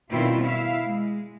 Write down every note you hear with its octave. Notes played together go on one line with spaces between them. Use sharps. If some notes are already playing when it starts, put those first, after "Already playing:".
B2 D#3 G3 C4 E4 F4
E4 E5 F5
G#3